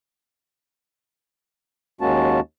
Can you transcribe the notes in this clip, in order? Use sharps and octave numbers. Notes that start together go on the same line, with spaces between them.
D#2 G#3 A#3 C#4 F#4 A5